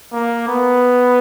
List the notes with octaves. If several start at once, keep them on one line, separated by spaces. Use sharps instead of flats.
A#3
B3